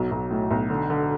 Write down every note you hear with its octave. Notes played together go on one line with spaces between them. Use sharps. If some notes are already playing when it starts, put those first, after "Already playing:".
Already playing: B1 F#3
B1
A2
B1
D3
D3